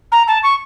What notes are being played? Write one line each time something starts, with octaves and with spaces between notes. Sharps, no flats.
A#5
A5
C#6